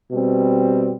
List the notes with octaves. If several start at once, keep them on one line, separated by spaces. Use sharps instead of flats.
B2 G3 C4